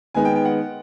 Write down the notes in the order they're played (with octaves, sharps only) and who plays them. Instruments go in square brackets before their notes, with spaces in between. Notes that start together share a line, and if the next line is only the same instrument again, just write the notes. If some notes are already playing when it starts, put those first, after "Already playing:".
[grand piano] D#3 G#3 B3 G#5
G5
G5
F#5